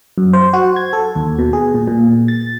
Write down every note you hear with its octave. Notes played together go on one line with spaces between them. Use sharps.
F#2
C5
F#4
G#6
A4
D#2
B2
G#4
A#2
A#2
A6